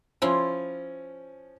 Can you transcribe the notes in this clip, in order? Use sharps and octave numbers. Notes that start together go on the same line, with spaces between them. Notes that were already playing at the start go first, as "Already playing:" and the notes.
F3 C#4 E4 F4 F5